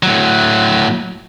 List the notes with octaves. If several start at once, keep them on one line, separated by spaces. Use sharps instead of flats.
A2 F#3